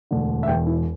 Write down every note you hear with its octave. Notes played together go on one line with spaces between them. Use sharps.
E1 D2 D3
E5
E1 E2 E3 G5
E4